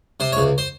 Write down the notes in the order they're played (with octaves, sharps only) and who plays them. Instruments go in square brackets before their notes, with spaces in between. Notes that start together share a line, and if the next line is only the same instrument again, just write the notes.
[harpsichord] C3 C5
C#5
C#2
C5